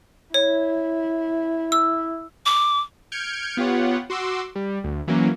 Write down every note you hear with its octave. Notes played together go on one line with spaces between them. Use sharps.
E4 C#5
E6
D6
F6 G6 G#6 C#7 D7
B3 F4 G4 C#5 F#5
F#4 C6 D6 E6
G3
D2
E3 F#3 A#3 C#4